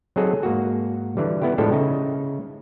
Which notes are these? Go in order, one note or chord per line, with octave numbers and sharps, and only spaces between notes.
F#3 C4 D#4 G#4 A4
G#2 A#3 F#4
D3 E3 G3
B3 E4 G4
A2 F3 G#3 D4 G4 A4
C#3 D#4 E4